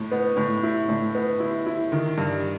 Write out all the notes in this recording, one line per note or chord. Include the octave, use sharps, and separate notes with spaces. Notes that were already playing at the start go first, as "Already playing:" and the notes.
Already playing: A2
B3
A2
E4
A2
B3
E4
E4
D#3
G2